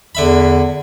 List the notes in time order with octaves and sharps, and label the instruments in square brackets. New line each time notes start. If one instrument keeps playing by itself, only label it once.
[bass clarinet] E2 [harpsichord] D3 E5 B5